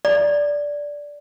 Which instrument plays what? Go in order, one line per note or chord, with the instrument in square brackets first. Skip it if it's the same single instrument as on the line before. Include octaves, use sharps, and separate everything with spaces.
[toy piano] D5